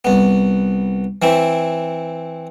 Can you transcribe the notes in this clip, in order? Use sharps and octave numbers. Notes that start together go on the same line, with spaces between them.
C2 B3
E3 C4 E4